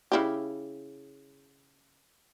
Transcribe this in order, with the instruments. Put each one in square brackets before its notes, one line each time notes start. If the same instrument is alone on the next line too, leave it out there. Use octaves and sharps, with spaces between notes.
[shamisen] C#3 E4 G4